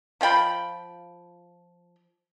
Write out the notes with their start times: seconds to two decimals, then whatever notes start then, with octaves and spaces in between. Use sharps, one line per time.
0.21 F3 F4 G5 B5